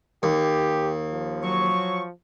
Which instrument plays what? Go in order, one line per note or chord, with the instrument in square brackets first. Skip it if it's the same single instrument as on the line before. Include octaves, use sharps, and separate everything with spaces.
[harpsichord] D#2 [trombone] G4
[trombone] F3
[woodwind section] F#3 C#6